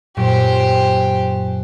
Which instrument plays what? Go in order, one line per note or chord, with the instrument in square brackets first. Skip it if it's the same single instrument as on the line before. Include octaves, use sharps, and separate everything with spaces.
[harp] F#2 A#2 F#3 [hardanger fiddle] G4 C5